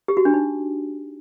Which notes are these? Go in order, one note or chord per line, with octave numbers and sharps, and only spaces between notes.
G4
F#4
D4
D#4